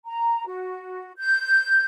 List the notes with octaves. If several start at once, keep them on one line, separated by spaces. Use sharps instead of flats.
A#5
F#4
G6